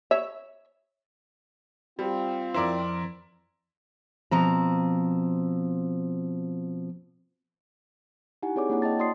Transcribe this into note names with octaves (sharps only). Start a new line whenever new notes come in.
C#5 E5
G3 C4 F4
F2 E4 A#4 C5 D5
B2 F3 C4 A#5
D#4 E4 G4 F#5 G#5
C4 G#4 C#5 D5 D6
A#3 D4 E4 C#5 F#5
D#5 G5 A5 A6
F#4 D5 C6 D#6 C7